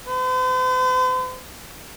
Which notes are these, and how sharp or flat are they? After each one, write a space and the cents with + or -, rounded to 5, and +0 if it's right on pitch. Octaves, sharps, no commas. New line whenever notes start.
C5 -45